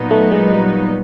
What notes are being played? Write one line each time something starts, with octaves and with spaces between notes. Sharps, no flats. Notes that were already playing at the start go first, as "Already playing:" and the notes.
Already playing: A#2 F#3 B3 D#4
A3
G#3
G3